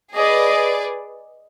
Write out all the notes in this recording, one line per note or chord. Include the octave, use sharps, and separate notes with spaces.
G#4 B4 D5 D#5